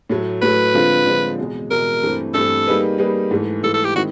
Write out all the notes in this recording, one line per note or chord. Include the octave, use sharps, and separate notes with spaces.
A2 F#3 A3
A2 F#3 A3 B4
D3 F3 G#3 C4 F4
D3 F3 G#3 C4 F4
E2 B2 G#3
E2 B2 G#3 A#4
G2 E3 A3 C4
G2 E3 A3 C4 A4
G3 A#3 D#4 G#4 B4
G3 A#3 D#4 G#4 B4
G#2 E3 A3
G#2 E3 A3 A4
A4
G4
D#3 G#3 C4 E4 F#4